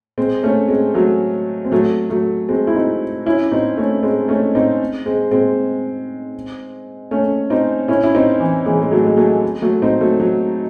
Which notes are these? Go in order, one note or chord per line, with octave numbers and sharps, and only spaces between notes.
G#3 C4
A3 C#4
G#3 C4
F#3 A3
C4
F#3 A3
F#3 A3
G#3 C4
E4
C4 D#4
C#4 E4
C4 D#4
A3 C#4
G#3 C4
A3 C#4
C4 D#4
G#3 C4
G#3 C4
A3 C#4
C4 D#4
C#4 E4
E4
C4 D#4
E3
E3 G#3
G#3
F#3 A3
G#3
F#3 A3
F#3 A3
C4 D#4
F#3 A3
F#3